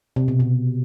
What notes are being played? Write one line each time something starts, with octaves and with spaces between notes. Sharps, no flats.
C3
B2
B2